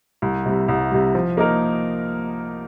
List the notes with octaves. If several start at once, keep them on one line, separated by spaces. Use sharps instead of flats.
C2
C3 G3
C2
C3 G3
F3
A#3 D#4 A#4